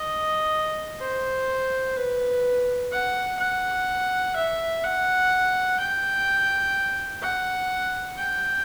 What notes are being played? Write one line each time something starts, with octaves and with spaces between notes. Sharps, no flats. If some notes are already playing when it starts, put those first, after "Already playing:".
Already playing: D#5
C5
B4
F#5
F#5
E5
F#5
G5
F#5
G5